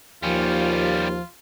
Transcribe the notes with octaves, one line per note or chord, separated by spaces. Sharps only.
D#2 F3 G3 C#4 F4